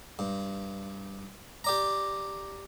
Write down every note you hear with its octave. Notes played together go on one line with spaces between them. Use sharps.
G2
G4 D5 A#5